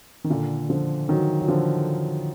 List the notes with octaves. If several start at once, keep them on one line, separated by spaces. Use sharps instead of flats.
D#3
A#2 D3
D3 F3
D#3 F#3
F#3
D3 F3